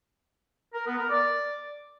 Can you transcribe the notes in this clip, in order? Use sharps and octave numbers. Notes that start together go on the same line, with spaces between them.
A#4
B3
A#4
D5